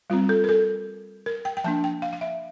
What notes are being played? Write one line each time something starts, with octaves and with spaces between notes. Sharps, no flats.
G3 C4 F4
A4
A#4
A4
A#4
G5
G5
F3 A#3 D4 A5
G5
F5
F5
E5